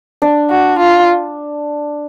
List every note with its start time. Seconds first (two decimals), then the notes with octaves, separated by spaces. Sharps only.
0.22 D4
0.50 F#4
0.79 F4